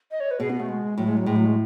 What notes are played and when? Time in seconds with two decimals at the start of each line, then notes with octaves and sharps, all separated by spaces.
0.11 D#5
0.20 C#5
0.31 B4
0.40 B2 G#4
0.50 B3
0.60 A3
0.68 G#3
0.98 A2 F#3
1.07 G#3
1.17 F#3
1.26 A2 G#3
1.36 F#3
1.45 G#3